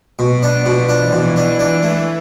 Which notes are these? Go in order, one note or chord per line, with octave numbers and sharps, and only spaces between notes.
B2 B3
D4
F3
B2
E3 D4
B2
D4
E3 D4
A3